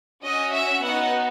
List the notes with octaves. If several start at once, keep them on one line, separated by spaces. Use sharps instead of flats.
C#4 F#4 D#5
E5
B3 D#4 F#4 F#5